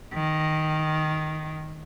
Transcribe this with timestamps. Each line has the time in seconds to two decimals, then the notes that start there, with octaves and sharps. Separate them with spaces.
0.14 D#3